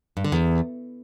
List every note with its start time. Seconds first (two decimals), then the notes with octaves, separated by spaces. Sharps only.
0.17 G2
0.24 D3
0.32 E2